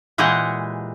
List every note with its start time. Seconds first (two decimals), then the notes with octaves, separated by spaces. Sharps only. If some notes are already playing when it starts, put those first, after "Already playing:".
0.18 A#2 E3 G#3 G4 G#4 F#5